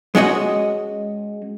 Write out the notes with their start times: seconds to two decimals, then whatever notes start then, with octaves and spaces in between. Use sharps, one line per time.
0.15 G#3 C#4 F#4 D#5